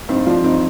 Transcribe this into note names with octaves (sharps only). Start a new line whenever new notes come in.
G2 C4 D#4
F3 D4 F4
G2 C4 D#4